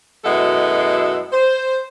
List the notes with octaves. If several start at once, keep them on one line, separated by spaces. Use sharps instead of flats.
F#2 B2 G#3 E4 A4 F#5
C5